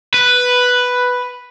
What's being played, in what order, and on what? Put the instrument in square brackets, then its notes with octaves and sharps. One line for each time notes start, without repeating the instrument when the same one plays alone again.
[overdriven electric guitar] B4